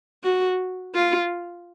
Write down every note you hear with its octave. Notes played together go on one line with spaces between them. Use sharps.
F#4
F4